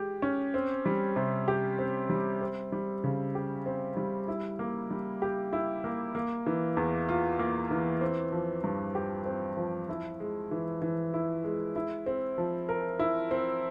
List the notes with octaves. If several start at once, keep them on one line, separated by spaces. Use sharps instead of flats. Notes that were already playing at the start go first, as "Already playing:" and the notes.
Already playing: G#3 G4
C#4
C4
G3
C3
G4
C4
G3
C4
G3
C#3
G4
C4
G3
E4
A#3
G3
G4
E4
A#3
A#3
E3
E2
F4
A#3
E3
C4
F3
G2
G4
C4
F3
E4
G#3
E3
E3
E4
G#3
E4
C4
F3
A#4
E4
C4